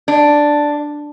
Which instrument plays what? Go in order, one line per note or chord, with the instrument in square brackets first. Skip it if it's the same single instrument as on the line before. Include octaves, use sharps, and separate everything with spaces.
[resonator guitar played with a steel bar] D4